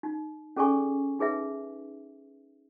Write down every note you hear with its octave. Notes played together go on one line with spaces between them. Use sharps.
D#4
C#4 G#4 A4 D5 G#5 C#6
D#4 G#4 B4 E5